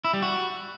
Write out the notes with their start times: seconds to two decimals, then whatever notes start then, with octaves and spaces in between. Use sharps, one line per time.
0.05 E4
0.13 G3
0.22 F#4